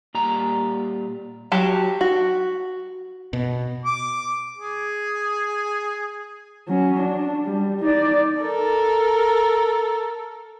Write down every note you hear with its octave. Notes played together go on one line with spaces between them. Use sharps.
A#2 G3 A#5
F#3 F#4 G4 A5
F#4
B2
D6
G#4
F#3 C#4
D4
G3
D#4 D5
A4 A#4